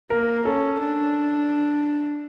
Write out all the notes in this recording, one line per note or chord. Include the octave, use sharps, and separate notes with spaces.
A#3 A#4
C#4 A4
D4